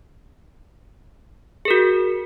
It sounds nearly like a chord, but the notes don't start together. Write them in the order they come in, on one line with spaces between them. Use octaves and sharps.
G#4 A#4 F#4